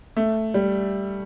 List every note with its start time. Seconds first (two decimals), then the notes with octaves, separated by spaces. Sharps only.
0.17 A3
0.54 G3